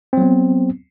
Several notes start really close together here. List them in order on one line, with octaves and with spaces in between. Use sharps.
C4 F#3 B3